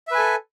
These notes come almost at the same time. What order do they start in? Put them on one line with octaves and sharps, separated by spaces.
E5 B4 G#5 A4